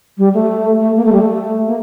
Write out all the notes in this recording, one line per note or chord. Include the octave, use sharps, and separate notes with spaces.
G3
A3
A3
A#3
A3
G3
A3
A#3